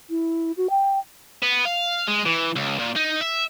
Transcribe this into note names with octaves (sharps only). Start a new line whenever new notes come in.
E4
F#4
G5
B3
F5
G#3
E3
C#2
A#2
D#4
E5